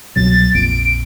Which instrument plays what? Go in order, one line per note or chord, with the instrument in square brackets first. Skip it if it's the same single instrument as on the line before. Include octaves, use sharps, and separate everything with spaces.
[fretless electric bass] C2 B2 F#3 [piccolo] A6
[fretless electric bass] A#1 F2 [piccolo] D7